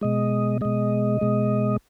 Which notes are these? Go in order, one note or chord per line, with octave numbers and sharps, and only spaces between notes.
B2 G#3 D#5
B2 G#3 D#5
B2 G#3